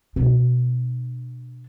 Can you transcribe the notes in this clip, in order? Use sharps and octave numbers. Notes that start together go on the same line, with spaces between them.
B2 D4